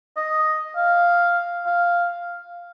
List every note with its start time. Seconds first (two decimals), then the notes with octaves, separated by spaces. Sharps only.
0.17 D#5
0.76 F5
1.66 F5